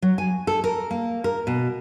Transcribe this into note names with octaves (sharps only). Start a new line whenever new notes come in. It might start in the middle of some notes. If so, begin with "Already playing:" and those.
F#3
G#5
A4
A#4
A#3
A#4
B2